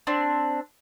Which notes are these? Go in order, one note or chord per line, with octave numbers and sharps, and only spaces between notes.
C4 D4